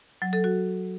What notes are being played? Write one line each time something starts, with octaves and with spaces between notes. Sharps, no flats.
F#3
A4
F#4